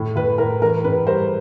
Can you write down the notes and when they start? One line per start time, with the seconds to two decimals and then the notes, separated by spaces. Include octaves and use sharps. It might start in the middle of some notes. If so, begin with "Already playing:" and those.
Already playing: A2
0.15 A2 B4
0.38 A2 A#4
0.62 E3 A#4
0.84 G#2 B4
1.06 G3 A#4 C5